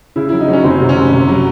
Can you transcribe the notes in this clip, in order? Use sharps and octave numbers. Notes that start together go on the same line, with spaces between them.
C#3 E4
F#3 E4
D#4
F#3 C#4
F#1 C4
C3
C#4
F#1
C3
F#3